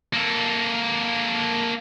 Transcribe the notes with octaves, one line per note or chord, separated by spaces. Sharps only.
A#3 A4